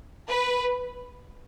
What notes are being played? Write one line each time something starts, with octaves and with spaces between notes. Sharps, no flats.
B4